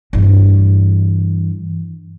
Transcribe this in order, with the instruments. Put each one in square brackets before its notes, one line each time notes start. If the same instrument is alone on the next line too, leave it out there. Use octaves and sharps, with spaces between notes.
[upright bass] G2 E3